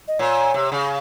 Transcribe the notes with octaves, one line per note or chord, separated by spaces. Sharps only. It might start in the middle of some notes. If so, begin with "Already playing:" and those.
D#5
A#2 C#5
C3
C#3